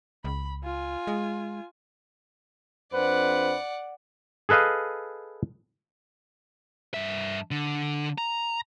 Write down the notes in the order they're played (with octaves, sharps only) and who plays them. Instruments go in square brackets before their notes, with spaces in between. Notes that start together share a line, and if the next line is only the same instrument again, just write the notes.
[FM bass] C#2 [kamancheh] B5
[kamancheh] F4 G#5
[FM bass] G#3
[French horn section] F2 D4 C5 [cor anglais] B4 [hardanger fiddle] D5 F#5
[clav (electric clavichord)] G#4 A4 B4 D#5 F5
[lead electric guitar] G2 E5
D3
A#5